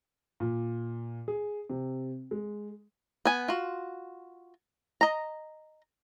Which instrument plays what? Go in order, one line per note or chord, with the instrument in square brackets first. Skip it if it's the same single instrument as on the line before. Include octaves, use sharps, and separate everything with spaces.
[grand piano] A#2
G#4
C3
G#3
[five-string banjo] B3 G#5
F4 F#4
D#5 A#5